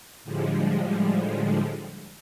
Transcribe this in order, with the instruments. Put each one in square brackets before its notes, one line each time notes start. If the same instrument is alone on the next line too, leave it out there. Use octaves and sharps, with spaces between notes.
[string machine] A2 D3 F3 G3 G#3